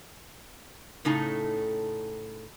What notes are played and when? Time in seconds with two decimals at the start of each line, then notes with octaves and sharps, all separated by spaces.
1.05 A2 C#3 A3 D#4 A4